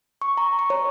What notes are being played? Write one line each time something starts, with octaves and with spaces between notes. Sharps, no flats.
C#6
A#5
C#6
C#5